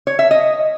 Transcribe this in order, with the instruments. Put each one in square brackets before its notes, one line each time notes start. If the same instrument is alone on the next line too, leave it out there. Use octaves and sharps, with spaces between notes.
[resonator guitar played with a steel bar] C#5
E5
D#5